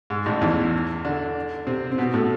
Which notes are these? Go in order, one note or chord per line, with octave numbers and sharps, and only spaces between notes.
G#2
A1 A2
E2 E3
D3 D4
C3 C4
C4
B2 B3
A2 A3